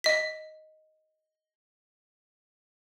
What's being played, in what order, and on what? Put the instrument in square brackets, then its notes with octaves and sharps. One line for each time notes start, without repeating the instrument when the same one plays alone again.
[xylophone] D#5 B6